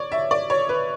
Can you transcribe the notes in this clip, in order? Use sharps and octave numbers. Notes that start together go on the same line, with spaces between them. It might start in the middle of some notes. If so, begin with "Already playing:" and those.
Already playing: C#5 D5
E5
D5
C#5
B4